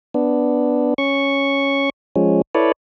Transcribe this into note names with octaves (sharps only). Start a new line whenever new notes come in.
B3 D4
C#4 C#6
F3 G#3 C#4
E4 A4 B4 C#5 D5